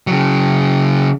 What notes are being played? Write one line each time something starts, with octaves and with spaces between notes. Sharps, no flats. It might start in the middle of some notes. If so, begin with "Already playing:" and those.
C#3 F#3